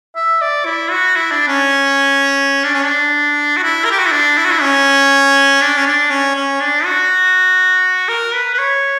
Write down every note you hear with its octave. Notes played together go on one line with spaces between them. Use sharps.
E5
D5
E4
F#4
E4
D4
C#4
D4
C#4
D4
F#4
E4
A#4
G4
F#4
E4
D4
E4
F#4
E4
C#4
D4
C#4
D4
C#4
C#4
D4
F#4
A#4
B4
B4
C#5